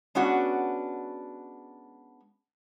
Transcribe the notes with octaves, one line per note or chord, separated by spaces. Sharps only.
G#3 B3 C#4 D4 F#4 F#5